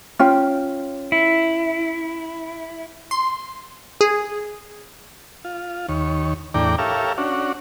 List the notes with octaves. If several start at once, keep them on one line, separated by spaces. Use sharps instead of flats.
C#4 F4 G5
E4
C6
G#4
F4
D#2 C#5
E2 A2 D4 D5 G5 A#5
G4 A4 A#4 C#5 E5 F5
C#4 D4 F#4